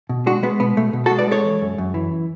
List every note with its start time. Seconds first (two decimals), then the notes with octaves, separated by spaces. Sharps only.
0.09 B2
0.26 G#3 D4 F#4
0.43 G#3 B3
0.60 B2 B3
0.77 B2 A3
0.93 B2
1.06 F#4 A4
1.11 G#3
1.19 B4 D5
1.27 G#3 A4 C#5
1.44 E3
1.61 F#2
1.78 F#2
1.94 E3